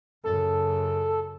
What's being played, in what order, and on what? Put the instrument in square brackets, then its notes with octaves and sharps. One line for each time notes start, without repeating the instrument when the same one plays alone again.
[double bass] F#2 C#3 [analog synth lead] A4